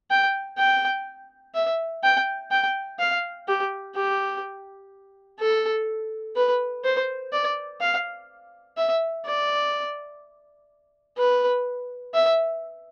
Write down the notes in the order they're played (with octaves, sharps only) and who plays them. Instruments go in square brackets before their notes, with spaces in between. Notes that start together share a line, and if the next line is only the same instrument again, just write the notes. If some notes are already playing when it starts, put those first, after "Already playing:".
[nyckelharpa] G5
G5
E5
G5
G5
F5
G4
G4
A4
B4
C5
D5
F5
E5
D5
B4
E5